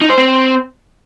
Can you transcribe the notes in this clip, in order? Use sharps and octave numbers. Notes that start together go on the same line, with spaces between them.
D#4
C5
C4